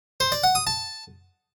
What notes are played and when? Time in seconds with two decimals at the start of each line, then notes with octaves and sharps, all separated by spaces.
0.20 C5
0.32 D5
0.44 F#5
0.55 D#6
0.67 A5